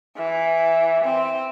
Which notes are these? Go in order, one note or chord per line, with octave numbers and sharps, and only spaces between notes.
E3
C4